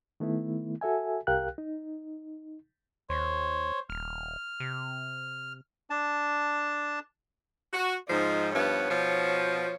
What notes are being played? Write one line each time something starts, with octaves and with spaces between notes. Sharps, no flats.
D#3 A3 B3 E4
F#4 A4 E5 G#5
C2 G4 A#4 F5 G5 F#6
D#4
D#2 C5 C#5
D#1 F6
C3
D4 A5
F#4
G#2 F3 D#4
G2 F3 B3 C#5
B2 F3